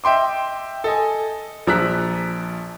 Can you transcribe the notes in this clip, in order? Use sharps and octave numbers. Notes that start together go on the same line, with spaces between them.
D#5 E5 G5 C6 D6
A4 D#5 G#5
A#1 F3 A#5 E6 F#6 B6